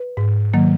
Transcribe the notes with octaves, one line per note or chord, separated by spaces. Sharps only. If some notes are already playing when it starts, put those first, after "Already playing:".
Already playing: B4
G#2
D#3 F#3 A#3